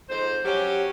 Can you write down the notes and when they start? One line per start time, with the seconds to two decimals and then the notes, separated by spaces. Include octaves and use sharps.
0.09 F2 G#2 C5
0.45 F#3 C#4 G4